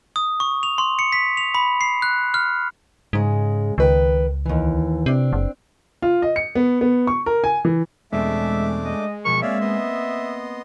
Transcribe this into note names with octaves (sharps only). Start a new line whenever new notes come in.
D#6
C#6
F7
C6
C#7
B6
F7
B5
C7
F#6
F6
G#2 C#3 G#3
C#2 D#3 B4 G5
D#2 E3
C3 C4 D4
F#1
F4
D#5
C#7
B3
B3
C#6
A#4
G#5
E3
E2 B2 G#3 A3 C4 D4 E5 D6
D#5
B2 F3 A#4 C#6
A#3 C4 C#5 D5 E5 F5
B3 D#5 C6